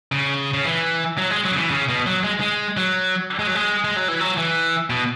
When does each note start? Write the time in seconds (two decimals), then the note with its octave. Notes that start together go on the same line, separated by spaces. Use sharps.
0.12 C#3
0.54 C#3
0.65 E3
1.18 F#3
1.31 G#3
1.45 F#3
1.52 C#3
1.58 E3
1.71 C#3
1.89 B2
2.06 F#3
2.24 G#3
2.40 G#3
2.77 F#3
3.39 G#3
3.47 F#3
3.55 G#3
3.84 G#3
3.96 F#3
4.08 E3
4.20 F#3
4.37 E3
4.90 B2